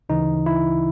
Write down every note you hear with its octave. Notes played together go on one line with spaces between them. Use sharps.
D2 C#3 E3 D#4
E4